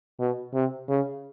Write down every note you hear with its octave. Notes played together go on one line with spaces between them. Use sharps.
B2
C3
C#3